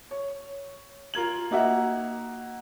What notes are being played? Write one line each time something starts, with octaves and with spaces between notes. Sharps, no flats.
C#5
F4 A#4 G#6 F#7
A#3 D#4 F#4 E5